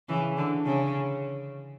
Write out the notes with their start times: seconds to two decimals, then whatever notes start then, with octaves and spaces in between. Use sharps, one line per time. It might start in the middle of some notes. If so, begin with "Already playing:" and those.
0.09 C#3 E3
0.37 D3
0.65 C#3